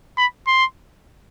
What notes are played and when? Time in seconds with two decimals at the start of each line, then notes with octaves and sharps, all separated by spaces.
0.17 B5
0.47 C6